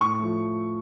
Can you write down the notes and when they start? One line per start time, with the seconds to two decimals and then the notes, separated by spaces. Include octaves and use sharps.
0.01 A2 C#6
0.19 F3 A3